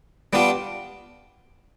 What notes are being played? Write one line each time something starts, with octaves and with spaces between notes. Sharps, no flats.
G3 B3 D4 F4